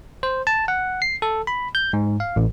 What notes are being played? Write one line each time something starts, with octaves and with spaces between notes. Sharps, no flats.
C5
A5
F#5
C7
A4
B5
G6
G#2
F5
A1